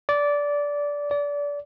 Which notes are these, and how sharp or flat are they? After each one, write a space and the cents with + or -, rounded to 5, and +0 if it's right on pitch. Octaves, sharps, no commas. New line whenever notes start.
D5 -15
D5 -25